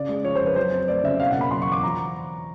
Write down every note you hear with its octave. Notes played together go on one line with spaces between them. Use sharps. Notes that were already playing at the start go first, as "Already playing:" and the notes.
Already playing: C#3 D5
G#3
F3 C#5
C5
F2
B4
F#3 C5
C4
A3 D5
C#3 E5
B2 F5
F#5
A#3
B5
F#3 C6
C#6
E2
D6
F3 A#5